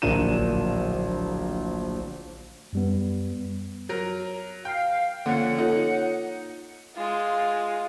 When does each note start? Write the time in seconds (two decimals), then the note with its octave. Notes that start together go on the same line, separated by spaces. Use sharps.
0.02 D1 A#1 D4 A#4 D#7 E7
2.73 F#2 G3 B3
3.89 F#3 A#4
4.65 F5 G5
5.26 D3 F3 A#3 C#4 F#5
5.58 D#4 F4 A4 C#5
6.96 G#3 F4